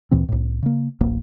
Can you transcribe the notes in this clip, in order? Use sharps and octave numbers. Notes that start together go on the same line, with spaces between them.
D2 A#2 E3 C4
C2 A2
C#3 A#3
D1 A1 A#3